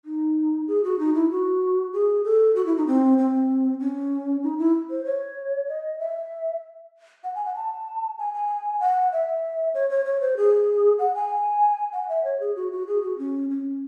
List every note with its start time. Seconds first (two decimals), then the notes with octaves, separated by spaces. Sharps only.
0.05 D#4
0.68 G#4
0.84 F#4
0.99 D#4
1.14 E4
1.31 F#4
1.93 G#4
2.24 A4
2.55 F#4
2.66 E4
2.77 D#4
2.87 C4
3.18 C4
3.80 C#4
4.43 D#4
4.59 E4
4.90 C5
5.05 C#5
5.69 D#5
5.99 E5
7.24 F#5
7.35 G#5
7.45 F#5
7.55 A5
8.18 G#5
8.34 G#5
8.80 F#5
9.13 E5
9.74 C#5
9.90 C#5
10.05 C#5
10.21 C5
10.37 G#4
10.99 F#5
11.15 G#5
11.93 F#5
12.09 E5
12.24 C#5
12.40 G#4
12.56 F#4
12.72 F#4
12.87 G#4
13.03 F#4
13.19 C#4
13.50 C#4